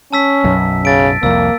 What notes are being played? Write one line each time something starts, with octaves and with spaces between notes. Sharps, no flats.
C#4 A5 E6 B6
B1 F#2
C#3 A6 D7
C2 F2 A#3 E6